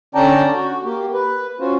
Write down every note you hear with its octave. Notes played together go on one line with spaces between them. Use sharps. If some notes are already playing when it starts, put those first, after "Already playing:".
D3 C#4 D5 G5 A5 A#5
F#4
A#3 G4
B4
C#4 F4 F#4 C5